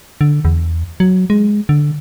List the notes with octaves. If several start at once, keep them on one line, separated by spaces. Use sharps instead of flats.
D3
E2
F#3
G#3
D3